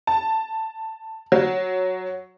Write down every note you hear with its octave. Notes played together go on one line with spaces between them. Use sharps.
A5
F#3